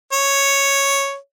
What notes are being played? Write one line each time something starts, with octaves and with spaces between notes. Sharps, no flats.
C#5